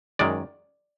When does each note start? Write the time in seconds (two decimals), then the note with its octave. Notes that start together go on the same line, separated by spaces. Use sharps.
0.19 F#2 D#3 G#3 D5